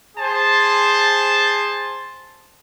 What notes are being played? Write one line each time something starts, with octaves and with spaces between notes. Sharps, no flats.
G#4 C5 A5